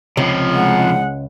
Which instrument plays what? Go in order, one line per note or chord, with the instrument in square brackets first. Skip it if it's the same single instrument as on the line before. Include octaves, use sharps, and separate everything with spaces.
[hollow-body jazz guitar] C#2 [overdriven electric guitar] C3 F3
[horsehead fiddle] G#3 F#5